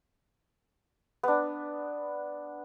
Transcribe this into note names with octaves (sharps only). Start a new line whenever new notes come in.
B3 D4